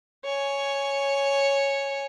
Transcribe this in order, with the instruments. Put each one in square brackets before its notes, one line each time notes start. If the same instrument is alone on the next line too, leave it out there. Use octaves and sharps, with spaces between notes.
[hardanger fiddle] C#5 G#5